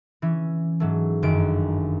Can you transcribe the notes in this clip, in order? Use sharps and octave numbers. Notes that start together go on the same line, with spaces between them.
E3 C#4
G#2 F#3 A3
G1 F#2 D#3 G#3 D7